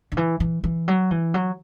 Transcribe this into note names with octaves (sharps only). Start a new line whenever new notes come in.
D3
E3
E3
E3
F#3
E3
F#3